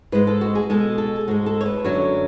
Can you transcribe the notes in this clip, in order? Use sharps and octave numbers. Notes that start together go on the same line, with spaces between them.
G#2 G#3 B4
A4
F#4
G#4
B2 G#3 A4
A4
G#2 G#3 F#4
A4
C#5
B4
F#2 D3 F#3 C#5